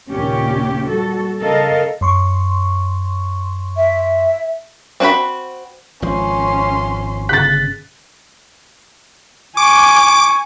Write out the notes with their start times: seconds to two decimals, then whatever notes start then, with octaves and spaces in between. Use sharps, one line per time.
0.11 D#2 A#2 C#3 C#4 G4
0.88 G3 F#4 A4
1.40 C#3 A4 A#4 D#5 F5
2.01 F#2 C6 C#6
3.77 E5
5.00 C4 F#4 A#4 F#5 B5
6.02 G#1 F3 C#4 C6
7.29 G1 C#3 F#6 A6 B6
9.57 G#5 C#6 D6